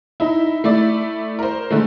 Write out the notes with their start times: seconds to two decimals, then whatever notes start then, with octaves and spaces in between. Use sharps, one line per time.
0.20 D#4 E4
0.64 A3 E4 D5
1.39 A#4 C5
1.71 D3 G#3 A3